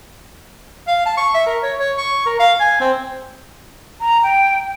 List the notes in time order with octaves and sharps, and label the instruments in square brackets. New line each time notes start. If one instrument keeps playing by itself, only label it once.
[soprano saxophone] F5
A5
C#6
E5
A#4
C#5
C#5
C#6
A#4
F5
G#5
C4
[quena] A#5
G5